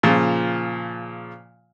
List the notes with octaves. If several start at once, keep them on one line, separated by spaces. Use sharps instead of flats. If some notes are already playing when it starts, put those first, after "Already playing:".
A#2 C#3 F3